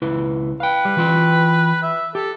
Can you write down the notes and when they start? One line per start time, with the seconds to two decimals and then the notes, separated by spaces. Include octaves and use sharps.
0.02 C#2 E4 B4
0.60 B4 F5 G5
0.85 G3
0.97 E3 F4 G5
1.83 E5
2.15 G4 A4